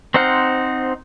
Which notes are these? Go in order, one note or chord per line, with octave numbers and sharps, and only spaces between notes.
C4 D#4 C5 F#5 F6